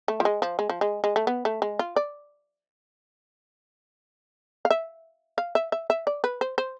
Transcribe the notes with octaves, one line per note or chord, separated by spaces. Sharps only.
A3
F3
G#3
F3
G#3
F3
G#3
G#3
A3
B3
A3
G#3
F4
D5
F5
E5
F5
E5
E5
E5
D5
B4
C5
C5